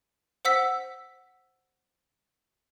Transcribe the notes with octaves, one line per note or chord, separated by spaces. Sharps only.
C5 F#5 E6 B6